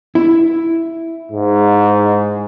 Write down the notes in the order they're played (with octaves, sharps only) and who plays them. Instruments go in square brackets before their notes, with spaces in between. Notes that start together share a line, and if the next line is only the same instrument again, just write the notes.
[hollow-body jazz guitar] E4
[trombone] G#2